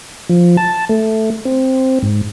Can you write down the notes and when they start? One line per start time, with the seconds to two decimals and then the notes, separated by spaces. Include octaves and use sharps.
0.29 F3
0.57 A5
0.89 A3
1.45 C4
2.02 G#2